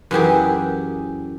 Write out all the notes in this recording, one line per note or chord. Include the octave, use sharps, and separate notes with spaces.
F#2 E3 G4 G#4